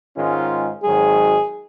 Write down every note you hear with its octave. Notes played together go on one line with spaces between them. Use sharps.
G#2 D#3 G#3 C#4 F4
G#1 G#2 D#3 F#3 G#4